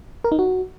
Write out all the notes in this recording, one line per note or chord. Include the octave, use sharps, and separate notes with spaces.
A#4
D#4
F#4